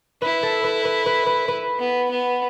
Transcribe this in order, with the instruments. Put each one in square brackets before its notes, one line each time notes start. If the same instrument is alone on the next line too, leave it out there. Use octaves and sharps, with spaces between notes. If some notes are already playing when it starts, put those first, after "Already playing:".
[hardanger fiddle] E4 [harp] B4
[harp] A4
B4
B4
B4
B4
B4
[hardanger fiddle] B3
B3